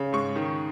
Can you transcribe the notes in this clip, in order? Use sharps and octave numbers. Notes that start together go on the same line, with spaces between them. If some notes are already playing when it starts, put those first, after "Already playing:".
Already playing: C#3
G#2 C#6
D#3